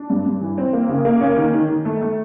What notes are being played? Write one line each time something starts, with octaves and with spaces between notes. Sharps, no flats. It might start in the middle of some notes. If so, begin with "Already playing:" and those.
Already playing: D4
G2
G2
E3
C4
A#3
C#3
A#3
C#4
D#3
D#3
D#3
A3
A3